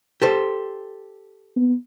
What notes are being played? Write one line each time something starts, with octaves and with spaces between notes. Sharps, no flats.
G4 A4 C5
B3